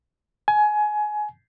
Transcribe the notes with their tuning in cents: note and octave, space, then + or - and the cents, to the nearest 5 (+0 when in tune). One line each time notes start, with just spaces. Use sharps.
G#5 +20